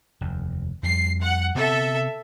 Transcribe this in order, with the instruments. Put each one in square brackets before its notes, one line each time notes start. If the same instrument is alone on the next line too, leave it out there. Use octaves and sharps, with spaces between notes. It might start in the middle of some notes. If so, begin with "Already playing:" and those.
[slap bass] F1 D#2
[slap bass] F2 G3 [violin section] C7
[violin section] F#5
[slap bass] C3 B3 C4 [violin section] A4 E5